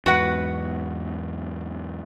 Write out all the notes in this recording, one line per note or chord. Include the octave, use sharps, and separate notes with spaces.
E2 G#2 F#4 B4 F#5